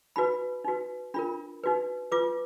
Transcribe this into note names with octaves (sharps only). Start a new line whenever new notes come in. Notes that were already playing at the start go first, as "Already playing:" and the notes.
D#4 F#4 B4 B5
D#4 F#4 B4
D4 F4 A#4 B5
D#4 F#4 B4
F4 B4 D6